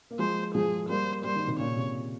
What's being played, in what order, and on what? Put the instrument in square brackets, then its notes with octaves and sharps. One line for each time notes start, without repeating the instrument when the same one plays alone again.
[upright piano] A#3
[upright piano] F3 G#3 [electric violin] C5
[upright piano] F3 G#3 [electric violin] G#4
[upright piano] G3 A#3 [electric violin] C5
[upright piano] G3 A#3 [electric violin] C5
[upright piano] D#3 G3
C3 D#3
[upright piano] A#2 C#3 [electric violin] C#5
[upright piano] C3